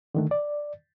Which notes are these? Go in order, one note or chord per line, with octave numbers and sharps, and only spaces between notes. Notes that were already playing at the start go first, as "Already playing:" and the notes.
D3 D#3 A3
D5